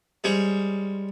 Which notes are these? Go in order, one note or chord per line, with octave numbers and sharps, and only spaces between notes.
G3 G#3 C#4 G#4 C5 F5